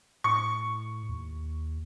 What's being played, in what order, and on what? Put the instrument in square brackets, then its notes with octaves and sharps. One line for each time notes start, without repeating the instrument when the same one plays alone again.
[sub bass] A2 [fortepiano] C#6
[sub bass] D#2